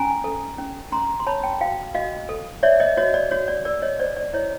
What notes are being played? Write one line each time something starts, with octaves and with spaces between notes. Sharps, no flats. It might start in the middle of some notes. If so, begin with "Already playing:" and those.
Already playing: C#4 G#5 A#5
A4
C#4
C#4 A#5 C6
C6
C#5 A5 B5
G5 A5
F#4 F5 G5
F#4 D#5 F5
A4
C#5 D5 E5
C#5 D#5
F#4 C#5 D#5
D5
F#4 C#5
D5
A#4 D5
C#5 D#5
C5 D5
D5
E4 C#5 D#5